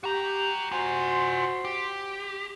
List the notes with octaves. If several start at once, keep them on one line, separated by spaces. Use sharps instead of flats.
F#4 G4 A#5
F4 F#4 C5 G#5 C6
G4